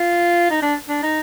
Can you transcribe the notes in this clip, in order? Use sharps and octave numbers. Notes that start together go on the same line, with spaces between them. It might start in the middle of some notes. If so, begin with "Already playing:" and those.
Already playing: F4
D#4
D4
D4
D#4